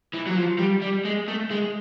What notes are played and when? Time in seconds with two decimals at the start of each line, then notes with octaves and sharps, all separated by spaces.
0.13 E3
0.27 F#3
0.36 F3
0.59 G3
0.82 G3
1.05 G#3
1.28 A3
1.51 G#3